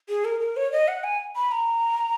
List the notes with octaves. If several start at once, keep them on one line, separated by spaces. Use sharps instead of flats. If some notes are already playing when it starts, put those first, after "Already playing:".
G#4
A#4
A#4
C#5
D#5
F#5
G#5
B5
A#5